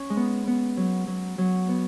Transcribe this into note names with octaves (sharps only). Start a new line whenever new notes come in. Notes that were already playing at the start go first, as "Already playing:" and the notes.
Already playing: C#4
G#3
B3
B3
F#3
F#3
F#3
B3